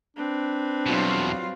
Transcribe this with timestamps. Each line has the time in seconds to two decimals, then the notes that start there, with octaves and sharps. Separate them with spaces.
0.16 C4 D4 B4
0.86 E2 B2 F#3 G3 F4